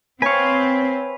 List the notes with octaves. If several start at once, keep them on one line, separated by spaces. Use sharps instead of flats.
C4 B4 C#5 F5 G#5 C#6